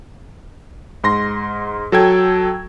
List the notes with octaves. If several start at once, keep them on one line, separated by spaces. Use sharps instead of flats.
G#2 C6 A#6
F#3 A4 G5 G#6